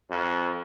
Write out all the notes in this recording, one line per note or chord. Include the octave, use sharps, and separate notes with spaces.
F2